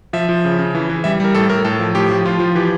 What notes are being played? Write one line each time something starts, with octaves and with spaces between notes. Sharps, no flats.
F3 E5
F3
C#3
C#3
E3
E3
G3 E5
G3 A#4
A2 A4
A2 A#4
A2 A4
F3
A2 G4
F3
F3 F4
F3
E3 G4